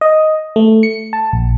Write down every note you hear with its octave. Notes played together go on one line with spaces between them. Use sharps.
D#5
A3
C#7
A5
A#1